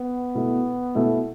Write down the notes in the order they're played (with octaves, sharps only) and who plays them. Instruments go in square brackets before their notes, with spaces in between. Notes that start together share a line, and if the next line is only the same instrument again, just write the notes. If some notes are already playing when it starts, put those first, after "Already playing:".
Already playing: [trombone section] B3
[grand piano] B2 A3 E4
B2 A3 E4